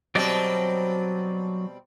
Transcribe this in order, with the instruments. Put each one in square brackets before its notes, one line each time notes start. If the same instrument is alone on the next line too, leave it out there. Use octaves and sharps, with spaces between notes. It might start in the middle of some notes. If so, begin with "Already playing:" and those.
[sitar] B2 G3 C4 [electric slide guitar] F#3 D5 D#5